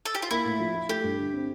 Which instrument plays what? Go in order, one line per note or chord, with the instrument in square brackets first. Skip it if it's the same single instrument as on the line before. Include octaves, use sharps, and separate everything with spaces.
[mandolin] A4
G4
F4
[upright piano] A#3 [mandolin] E4
[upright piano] A2
F3
F4
[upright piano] A3 [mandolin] G4
[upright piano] G2
D3
C4